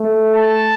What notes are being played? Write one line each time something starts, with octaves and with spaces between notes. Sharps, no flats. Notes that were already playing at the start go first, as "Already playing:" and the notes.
Already playing: A3
A5